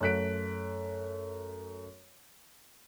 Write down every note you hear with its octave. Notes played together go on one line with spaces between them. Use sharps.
F#2 A3 F#6 B6 D7